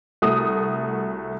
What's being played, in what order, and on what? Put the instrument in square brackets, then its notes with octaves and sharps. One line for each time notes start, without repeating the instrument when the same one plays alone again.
[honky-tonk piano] C2 A3 F#4 D#6